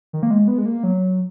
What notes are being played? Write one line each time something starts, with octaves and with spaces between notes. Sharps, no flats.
D#3
A#3
G#3
B3
G#3
A#3
F#3